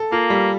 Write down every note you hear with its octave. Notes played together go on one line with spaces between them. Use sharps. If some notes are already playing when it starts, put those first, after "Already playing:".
Already playing: A4
A#3 F4
G3